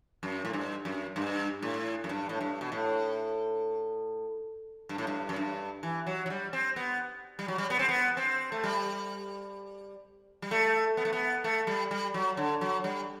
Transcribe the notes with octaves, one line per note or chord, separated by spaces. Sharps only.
F#2
A2
G2
F#2
G2
A2
F#2
G2
A2
G2
B2
A2
G2
A2
G2
F#2
G2
E3
F#3
F#3
G3
C4
B3
G3
F#3
G3
B3
C4
B3
C4
A3
G3
G3
A3
B3
A3
B3
A3
G3
G3
F#3
D3
F#3
G3